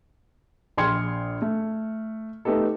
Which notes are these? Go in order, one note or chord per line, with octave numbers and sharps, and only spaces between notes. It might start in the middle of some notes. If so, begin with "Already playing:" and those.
A#1 G5 C6 F6 G#6 C#7
A3
A3 B3 D#4 G4 A4